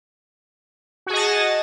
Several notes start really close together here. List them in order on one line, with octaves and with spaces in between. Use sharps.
F#4 G#4 D#5 A5